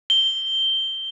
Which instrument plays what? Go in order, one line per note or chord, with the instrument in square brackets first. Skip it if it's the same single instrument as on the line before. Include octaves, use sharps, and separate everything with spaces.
[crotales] G7